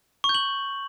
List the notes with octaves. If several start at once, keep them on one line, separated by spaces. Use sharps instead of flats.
C#6
G6
F#7